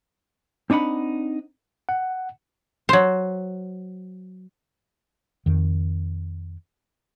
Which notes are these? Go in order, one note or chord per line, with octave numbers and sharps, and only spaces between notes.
C4 D4 D#4 F#5 B5
F#5
F#3 C5
F2 D#3